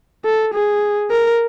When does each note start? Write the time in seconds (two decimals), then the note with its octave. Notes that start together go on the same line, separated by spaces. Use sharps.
0.25 A4
0.54 G#4
1.11 A#4